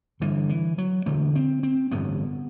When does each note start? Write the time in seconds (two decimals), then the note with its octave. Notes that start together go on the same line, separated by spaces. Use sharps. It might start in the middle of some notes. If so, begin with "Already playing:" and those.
0.20 G1 G2 D3 E3
0.49 E3
0.78 F#3
1.06 E1 D2 D3 A3
1.35 C4
1.63 C4
1.91 A1 G2 D3 B3